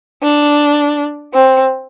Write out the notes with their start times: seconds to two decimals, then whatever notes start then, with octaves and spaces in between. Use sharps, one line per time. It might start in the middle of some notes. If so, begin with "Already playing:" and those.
0.22 D4
1.34 C4